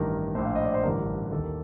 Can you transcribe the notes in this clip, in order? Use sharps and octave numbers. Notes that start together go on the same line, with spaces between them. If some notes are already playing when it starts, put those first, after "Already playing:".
Already playing: A1 G2 D#3 A#4
A#1 A2 C5
F5
D#5
D5
C5
A1 G2 D3 A#4
D#2 D#3 A4
A#4